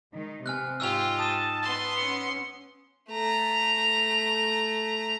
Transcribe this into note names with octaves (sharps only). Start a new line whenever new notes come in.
D#3 G#3 D#4
C3 B3 C4 G#5 F6 F#6
G#2 D#4 F4 G4 E6 F7
A5 D#6 D#7
B3 C6
C#4 C#7
A3 A#5